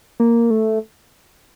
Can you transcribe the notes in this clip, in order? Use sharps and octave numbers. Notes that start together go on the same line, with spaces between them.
A#3
A3